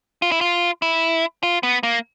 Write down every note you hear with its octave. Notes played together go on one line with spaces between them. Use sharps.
F4
E4
F4
E4
F4
B3
A#3